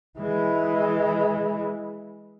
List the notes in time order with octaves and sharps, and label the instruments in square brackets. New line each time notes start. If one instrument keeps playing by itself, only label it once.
[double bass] E3 G#3